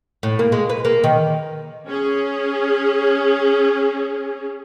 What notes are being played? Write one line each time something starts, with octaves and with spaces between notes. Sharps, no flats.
A2
A#3
G#3
B4
A#3
D#3
C#4 G#4